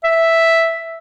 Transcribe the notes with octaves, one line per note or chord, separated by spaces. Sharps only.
E5